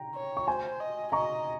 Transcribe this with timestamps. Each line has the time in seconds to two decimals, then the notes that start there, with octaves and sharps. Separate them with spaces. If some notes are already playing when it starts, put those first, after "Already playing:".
Already playing: G5 A#5
0.15 C#5
0.37 C#6
0.47 C5 G#5 C6
0.80 D#5
1.12 D#5 A#5 C#6